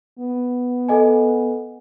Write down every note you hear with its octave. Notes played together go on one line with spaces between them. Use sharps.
B3
A4 D#5 G#5